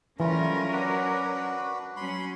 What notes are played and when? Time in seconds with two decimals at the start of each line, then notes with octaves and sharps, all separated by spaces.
0.20 E3 F#3 G3 A3 C#4 F4 A#4
0.73 D4 F#4 B4
1.97 F#3 C#4 B5 C6